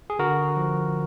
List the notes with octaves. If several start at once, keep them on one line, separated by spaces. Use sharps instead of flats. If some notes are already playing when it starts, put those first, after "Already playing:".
G#4
D3 F#4 A#4
F3